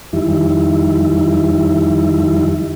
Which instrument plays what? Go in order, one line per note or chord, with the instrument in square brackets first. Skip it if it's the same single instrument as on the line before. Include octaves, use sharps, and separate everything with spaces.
[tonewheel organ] F2 D#3 G3 E4